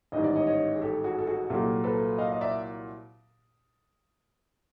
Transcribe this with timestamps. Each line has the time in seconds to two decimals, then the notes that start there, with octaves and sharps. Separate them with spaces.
0.12 A1 G#2 D#3 G3 D#5
0.24 D5
0.35 C#5 D#5
0.47 C#5 D#5
0.75 G#4
0.82 G4 A4
1.04 F#4 G#4
1.18 A4
1.27 F#4 G#4
1.50 C2 A#2 F#3 A#3 G4 A4
1.84 A4 B4
2.18 D#5 F5
2.32 D#5
2.41 D5 E5